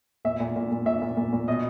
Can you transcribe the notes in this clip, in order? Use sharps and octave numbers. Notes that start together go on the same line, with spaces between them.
A#2 E5
A#2
A#2
A#2
A#2 E5
A#2
A#2
A#2
B2 D#5